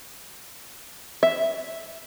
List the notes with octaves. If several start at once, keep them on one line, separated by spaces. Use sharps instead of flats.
E5